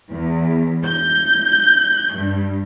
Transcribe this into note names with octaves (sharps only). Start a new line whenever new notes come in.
E2
G6
G2